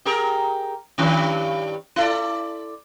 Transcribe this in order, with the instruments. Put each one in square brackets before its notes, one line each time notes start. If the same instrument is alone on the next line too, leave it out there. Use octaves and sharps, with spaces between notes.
[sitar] G4 G#4 A#4
G2 D#3 C#4
E4 A4 D5